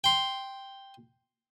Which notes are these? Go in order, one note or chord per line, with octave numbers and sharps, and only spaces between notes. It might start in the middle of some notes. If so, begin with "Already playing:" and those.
G5 C6